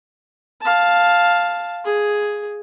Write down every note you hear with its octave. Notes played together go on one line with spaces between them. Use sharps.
F5 A5
G#4